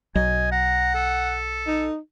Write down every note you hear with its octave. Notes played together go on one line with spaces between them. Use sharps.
B1 F#3 D#5 G#5
F#5 A#5
A4
D#4